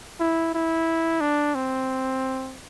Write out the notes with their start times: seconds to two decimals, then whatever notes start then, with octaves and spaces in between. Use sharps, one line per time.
0.20 E4
0.54 E4
1.21 D4
1.55 C4